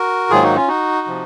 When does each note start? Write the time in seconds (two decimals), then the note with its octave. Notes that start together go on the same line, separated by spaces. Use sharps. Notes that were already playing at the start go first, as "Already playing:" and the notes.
Already playing: F#4 A#4
0.30 G#2 D#3 F#3 A#3 F4 G#4
0.42 D#4 F#4
0.55 C#4 F4
0.68 D#4 F#4
1.07 C3 F3